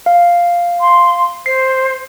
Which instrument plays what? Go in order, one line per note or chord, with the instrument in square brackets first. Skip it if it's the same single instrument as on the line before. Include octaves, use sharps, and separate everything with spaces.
[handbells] F5
[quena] C6
[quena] C5 [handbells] C7